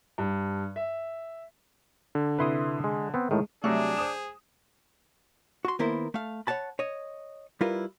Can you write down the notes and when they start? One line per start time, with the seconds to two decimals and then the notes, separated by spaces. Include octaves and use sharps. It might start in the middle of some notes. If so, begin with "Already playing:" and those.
0.18 G2
0.76 E5
2.15 D3
2.39 C3 E4 B4 C6 D#6
2.84 G#3
3.14 B3 C4
3.31 A2 D#3 G#3
3.64 C3 F#3 G3 A3 D4 G#4
3.97 C5 D#6 E7
5.65 F#4 C6
5.79 D#3 A#3 B3 E4 A#4 C5
6.14 A3 F5
6.47 C#5 E5 F#5 A5 B5
6.79 C#5 D#5
7.61 G3 E4 F4 A#4 B4